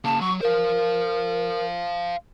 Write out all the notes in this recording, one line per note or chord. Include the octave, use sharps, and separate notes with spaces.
C#3 A#3 A5
F#3 C#6
A#4 C5 F5